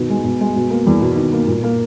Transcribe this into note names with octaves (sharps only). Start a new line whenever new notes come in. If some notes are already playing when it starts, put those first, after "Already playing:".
Already playing: B2 D#3
G#3
B2
G#3
B2
A#3
E2
B2
D#3
A#3
A#2
A#3